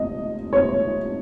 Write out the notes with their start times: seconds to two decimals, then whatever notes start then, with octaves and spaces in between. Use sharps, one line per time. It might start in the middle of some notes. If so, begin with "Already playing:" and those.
Already playing: D#5
0.53 C#5